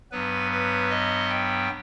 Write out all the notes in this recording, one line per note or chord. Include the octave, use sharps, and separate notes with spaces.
G2 F#3 B3 B4
B4
D#5
G5